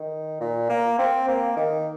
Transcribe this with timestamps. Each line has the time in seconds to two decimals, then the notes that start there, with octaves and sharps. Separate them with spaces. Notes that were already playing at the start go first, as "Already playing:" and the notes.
Already playing: D#3
0.40 A#2
0.69 A#3
0.98 C4
1.28 A#3
1.57 D#3